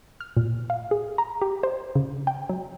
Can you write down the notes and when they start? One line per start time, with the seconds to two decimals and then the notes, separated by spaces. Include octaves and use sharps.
0.21 F6
0.37 A#2
0.70 F5
0.91 G#4
1.18 A#5
1.42 G4
1.63 C5
1.96 C#3
2.27 G5
2.49 F#3